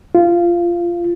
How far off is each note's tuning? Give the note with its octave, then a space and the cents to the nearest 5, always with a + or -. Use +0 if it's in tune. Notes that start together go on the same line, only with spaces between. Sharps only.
F4 -15